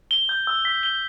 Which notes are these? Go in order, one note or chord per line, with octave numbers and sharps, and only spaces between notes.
G7
G6
E6
B6
G7